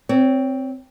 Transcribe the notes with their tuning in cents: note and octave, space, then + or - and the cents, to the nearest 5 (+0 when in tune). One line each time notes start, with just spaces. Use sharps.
C4 +0 C#5 +25